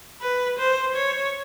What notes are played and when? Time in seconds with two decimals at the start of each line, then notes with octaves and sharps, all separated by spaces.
0.22 B4
0.59 C5
0.96 C#5